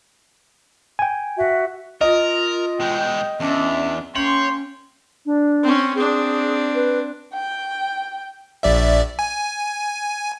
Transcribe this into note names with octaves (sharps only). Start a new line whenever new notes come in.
G5 G#5
F#4 E5
F4 A#4 D#5
B2 G#3 G5
E2 C#4 D4 E5
A#3 C#4 C#5 G5 C6 F#7
D4
C4 C#4
C4 D4 G#4
B4
G5
A#1 D5 E5
G#5